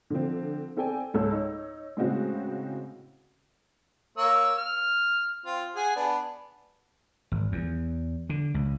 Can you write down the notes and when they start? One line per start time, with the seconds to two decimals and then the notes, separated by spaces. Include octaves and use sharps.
0.10 D3 F3 C4
0.77 C4 A4 D5 G5 G#5
1.14 C#2 G#2 A4 C#5 E6
1.31 D#4 C#5
1.97 A2 C#3 G#3 C4 F#4
4.18 A#3 C#5 E6
4.58 F6
5.46 C4 F4
5.76 G#4 F#5 G#5
5.96 B3 D4
7.32 G#1
7.52 E2
8.30 D3
8.54 C#2